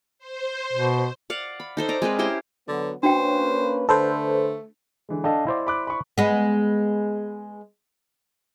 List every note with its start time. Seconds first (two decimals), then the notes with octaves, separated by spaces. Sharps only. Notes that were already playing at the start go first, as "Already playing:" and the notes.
0.19 C5
0.73 B2
1.30 D5 F5 F#5
1.60 B5
1.77 D#4 A4 C5
1.89 D5 A#5
2.02 G#3 C4 A#4 B4
2.19 C#4 E4 G4 C5
2.68 D3 F#3 B3
3.03 A#3 C#4 D4 F#4 B4 C5 G5
3.89 D3 A3 A4 B4 C5
5.09 D3 E3 G#3
5.24 D4 A4 D#5 F5 G5
5.47 E4 C5 D5
5.67 B5 D6 F#6
5.87 B5 C#6
6.18 G#3 B3